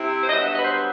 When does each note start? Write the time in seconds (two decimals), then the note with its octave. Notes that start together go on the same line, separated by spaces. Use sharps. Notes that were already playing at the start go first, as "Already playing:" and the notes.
Already playing: C3 C4 E4
0.22 C5
0.27 G2 F#3 B3 D#5
0.40 E5
0.53 D#5
0.59 B4
0.64 C5